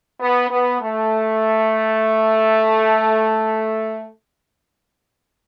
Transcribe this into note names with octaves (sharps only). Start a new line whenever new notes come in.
B3
B3
A3